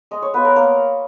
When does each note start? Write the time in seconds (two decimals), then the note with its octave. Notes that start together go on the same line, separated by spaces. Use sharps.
0.11 G#3 D#5
0.22 C#5
0.34 B3 F4 B4
0.44 A#4
0.56 A#3 A#4